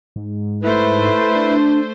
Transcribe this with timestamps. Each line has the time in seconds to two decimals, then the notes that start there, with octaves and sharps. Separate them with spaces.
0.16 G#2
0.63 A3 E4 B4 C5
1.35 D4